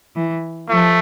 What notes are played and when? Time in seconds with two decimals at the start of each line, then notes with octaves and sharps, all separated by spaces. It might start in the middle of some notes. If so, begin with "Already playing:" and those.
0.16 E3
0.69 F3 A3